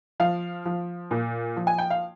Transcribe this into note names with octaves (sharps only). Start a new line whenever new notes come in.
F3 F5
F3
A#2
F3
G#5
G5
F5